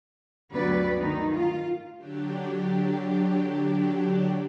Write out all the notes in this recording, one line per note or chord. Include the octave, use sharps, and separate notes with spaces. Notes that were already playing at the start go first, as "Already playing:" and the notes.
D2 G2 F#3 B3 B4 D5
D#3 A3 D#4
F4
D3 F#3 D4 G4